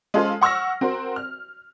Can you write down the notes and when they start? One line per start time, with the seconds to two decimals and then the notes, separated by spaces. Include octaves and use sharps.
0.14 G#3 C#4 F4 A4 C5
0.41 F#5 C#6 E6 F6 A#6
0.81 C4 F#4 A#4 C5
1.16 F6